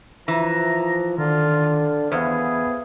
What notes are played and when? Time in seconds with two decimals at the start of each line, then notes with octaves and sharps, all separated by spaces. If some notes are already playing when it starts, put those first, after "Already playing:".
0.28 E3 F3 A#5
1.18 D3 D#3 F4
2.12 E2 B3 G#4 C5 F5